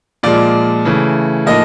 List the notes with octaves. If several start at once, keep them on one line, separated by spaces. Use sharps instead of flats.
A#2 F3 G#3 D5
C#3 E3 A3
A2 F3 A#3 D#4 D#5